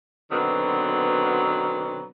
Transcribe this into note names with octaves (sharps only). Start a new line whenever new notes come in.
B2 D3 D#3 F#3 B3 C4